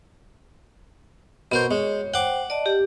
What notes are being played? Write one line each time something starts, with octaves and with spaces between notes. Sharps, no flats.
B2 B3 A#4 C5 C#6
G#3 C#5
C5 F#5 G5 D6
D5 D#5 A5
G4